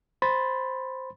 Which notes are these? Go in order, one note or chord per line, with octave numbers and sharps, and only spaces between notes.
C5 B5 C6 A6